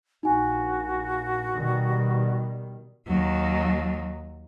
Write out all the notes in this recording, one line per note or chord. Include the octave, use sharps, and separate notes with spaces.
A#1 A#3 D#4 F#4 G#5
B2 D#3 G3
D#2 F#3